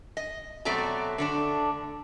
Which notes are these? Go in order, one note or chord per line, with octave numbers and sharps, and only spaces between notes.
D#5
B2 F#3 A3 C4 D5 A#5
D3 A3 D4